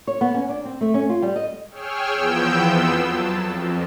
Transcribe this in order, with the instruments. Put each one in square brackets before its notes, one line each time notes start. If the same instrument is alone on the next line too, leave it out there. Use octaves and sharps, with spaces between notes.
[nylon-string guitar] C#5
B3
C#4
D4
C4
A3
C#4
F4
G3
D#5
[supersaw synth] G#4 C#5 G5 E6 F6
E2 F3 B3 G5 E6 G6
F2 B3 C6 E6
F#3 A5
F2